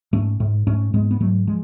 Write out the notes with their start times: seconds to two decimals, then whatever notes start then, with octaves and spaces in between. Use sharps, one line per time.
0.13 G#2 A3 C#4
0.40 G#2
0.67 G#2 A3 C#4
0.94 G#2 G#3 B3
1.11 B3
1.20 G#2 F#3 A3
1.47 F3 G#3